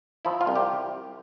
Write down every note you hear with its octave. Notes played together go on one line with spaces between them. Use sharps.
F3 E4
F4
C2
G4